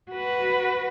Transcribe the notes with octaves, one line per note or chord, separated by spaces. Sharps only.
F#4 B4